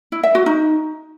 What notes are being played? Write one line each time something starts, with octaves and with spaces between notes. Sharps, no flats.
E4
E5
F#4
D#4